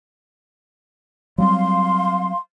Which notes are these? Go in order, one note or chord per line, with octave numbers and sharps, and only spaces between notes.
F#3 G3 C4 F5 C6